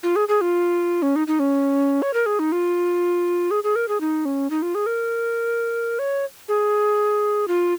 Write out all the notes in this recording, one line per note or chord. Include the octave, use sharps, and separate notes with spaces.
F4
G#4
G#4
F4
C#4
D#4
D#4
C#4
C#5
A#4
G#4
D#4
F4
G#4
G#4
A#4
G#4
D#4
C#4
D#4
F4
G#4
A#4
C#5
G#4
F4